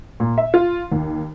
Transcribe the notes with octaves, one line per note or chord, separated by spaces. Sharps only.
A#2
E5
F4
D#2